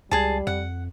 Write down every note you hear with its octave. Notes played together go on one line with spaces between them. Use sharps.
C#2 G3 G#4 A5
F2 F#5